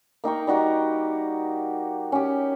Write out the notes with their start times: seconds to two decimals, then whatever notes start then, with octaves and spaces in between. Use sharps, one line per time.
0.24 A#3 D#4 G5 C#6
0.47 G3 D#4 F#4 G4
2.12 C#4 G4